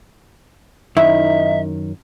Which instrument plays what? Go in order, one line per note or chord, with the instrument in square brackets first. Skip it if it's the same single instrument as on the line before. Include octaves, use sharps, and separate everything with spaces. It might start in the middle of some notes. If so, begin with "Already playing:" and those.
[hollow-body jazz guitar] F#2 D#3 [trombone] D#4 [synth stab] E4 [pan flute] E5